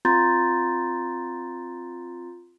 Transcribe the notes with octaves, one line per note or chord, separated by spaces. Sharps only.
C4 F4 A#5 C6 G6 A6